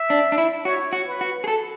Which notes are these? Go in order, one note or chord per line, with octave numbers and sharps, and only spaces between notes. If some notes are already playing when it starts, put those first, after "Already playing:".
Already playing: E5
D4
D4
E4
F#4 C#5
F#4
B4
F#4
G#4
A4